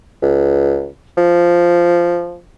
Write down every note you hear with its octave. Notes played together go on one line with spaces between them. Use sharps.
C#2
F3